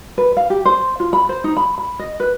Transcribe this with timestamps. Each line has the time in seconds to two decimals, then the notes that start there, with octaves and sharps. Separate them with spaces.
0.18 B4
0.37 F5
0.50 G4
0.65 C5
1.00 F4
1.13 B5
1.29 C5
1.44 D#4
1.57 B5
1.78 B5
1.99 D#5
2.20 B4